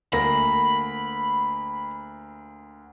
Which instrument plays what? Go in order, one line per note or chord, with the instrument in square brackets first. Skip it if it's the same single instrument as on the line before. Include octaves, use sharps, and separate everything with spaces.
[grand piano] D2 A#3 A#6 [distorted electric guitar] B5